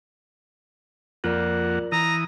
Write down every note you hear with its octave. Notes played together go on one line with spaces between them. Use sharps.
F2 A#3 F4 A#4 D5 F#5
E3 A#5 D#6